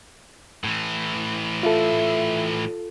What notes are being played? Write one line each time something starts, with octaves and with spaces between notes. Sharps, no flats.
A2 E3
F4 A4 E5